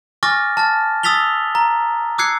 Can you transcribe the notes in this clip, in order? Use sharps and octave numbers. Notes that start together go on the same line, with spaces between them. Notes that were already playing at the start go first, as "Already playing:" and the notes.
G#5 C#6 D6 F6 A6 A#6
A5 F6 A6
D#6 E6 A6 B6 F7 G7
A#5
D6 E6 F#6 G#6 C7 C#7